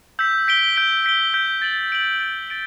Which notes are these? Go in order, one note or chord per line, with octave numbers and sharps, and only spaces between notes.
E6 G6 B6
G6 B6 D7 G7
G6 B6 D7 G7
G6 B6 D7 G7
G6 B6 D7 G7
A6 D7 F#7
A6 D7 F#7
A6 D7 F#7
A6 D7 F#7